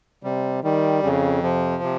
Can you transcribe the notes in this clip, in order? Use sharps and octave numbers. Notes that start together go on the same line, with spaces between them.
C3 G3
D#3 G3
F2 C#3
C3 F3
C3